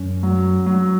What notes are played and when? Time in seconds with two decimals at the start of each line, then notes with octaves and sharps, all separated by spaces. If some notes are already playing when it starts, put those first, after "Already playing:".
Already playing: F#2 C#4
0.23 F#3
0.66 F#3